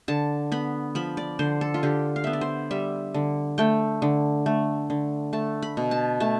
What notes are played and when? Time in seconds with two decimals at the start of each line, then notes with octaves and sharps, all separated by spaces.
0.08 D3 A5
0.52 B3 B5
0.95 F3 B5
1.17 D5
1.39 D3 C5
1.61 A4
1.74 F4
1.83 D3 G4
2.16 F5
2.24 B3 E5
2.33 D5
2.41 C5
2.71 G3 E5
3.14 D3
3.58 A3 G5
4.02 D3
4.46 A3
4.90 D3
5.33 A3 A5
5.62 B5
5.77 B2
5.91 A5
6.20 A3 A5